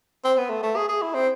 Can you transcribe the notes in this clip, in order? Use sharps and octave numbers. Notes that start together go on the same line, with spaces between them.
C4
B3
A3
A3
G#4
G#4
E4
C4